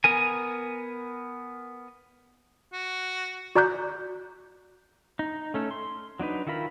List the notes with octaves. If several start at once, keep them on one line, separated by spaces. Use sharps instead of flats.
B3 A#4 G#5
F#4
F#4 D5 A#5 D6 F#6 G6
D#4
A3 C#4 A4
C6
F#3 D4 D#4 B4
D#3 E4 F4 A#4 B5